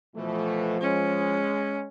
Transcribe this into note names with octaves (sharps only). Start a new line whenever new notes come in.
B2 E3 F3 A3
G#3 C#4